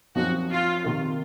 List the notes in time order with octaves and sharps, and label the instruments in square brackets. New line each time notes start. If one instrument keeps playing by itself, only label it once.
[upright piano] F#2 F3 C4 D#4 [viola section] F#4
[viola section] F4
[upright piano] C3 D#3 A#3 F4 A#4